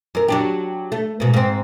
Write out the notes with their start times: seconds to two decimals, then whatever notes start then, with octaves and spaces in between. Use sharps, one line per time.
0.15 F#2 A#4
0.28 F#3 D4 G4
0.92 A3
1.20 G#2 B2
1.34 G#2 C4